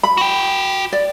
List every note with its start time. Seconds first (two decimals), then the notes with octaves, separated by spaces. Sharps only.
0.03 B5
0.18 F#4 G5
0.92 D5